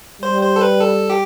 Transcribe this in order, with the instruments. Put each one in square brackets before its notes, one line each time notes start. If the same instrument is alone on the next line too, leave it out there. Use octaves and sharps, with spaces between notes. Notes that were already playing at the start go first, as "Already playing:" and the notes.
[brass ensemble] G3 [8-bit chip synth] C5
[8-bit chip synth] C5
A4
B4
A4
G4